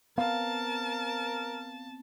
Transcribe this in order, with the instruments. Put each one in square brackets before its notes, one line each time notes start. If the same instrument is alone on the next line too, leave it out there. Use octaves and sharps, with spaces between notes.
[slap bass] B3 C4 [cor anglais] A#4 [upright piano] F5 [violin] A5